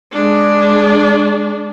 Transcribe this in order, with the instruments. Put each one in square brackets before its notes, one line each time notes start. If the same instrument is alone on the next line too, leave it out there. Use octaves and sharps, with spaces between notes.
[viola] G#3 D4